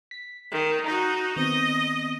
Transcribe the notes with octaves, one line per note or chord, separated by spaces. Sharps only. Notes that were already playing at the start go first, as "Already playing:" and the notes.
B6
D#3
D#4 F#4 A#5
D#3 B3 C4 D#5